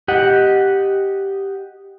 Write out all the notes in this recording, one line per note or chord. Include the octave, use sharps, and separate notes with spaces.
G4 D#5 F#5